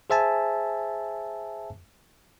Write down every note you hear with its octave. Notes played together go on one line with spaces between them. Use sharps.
G#4 C5 E5 G#5 A5